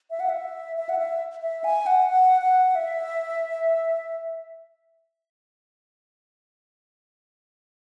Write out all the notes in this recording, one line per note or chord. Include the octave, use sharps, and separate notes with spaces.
E5
F#5
E5
E5
F#5
E5
E5
G#5
F#5
F#5
F#5
E5